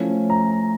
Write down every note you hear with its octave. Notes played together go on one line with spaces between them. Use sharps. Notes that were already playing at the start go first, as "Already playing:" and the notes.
Already playing: F3 A3 C#4 E4
A#5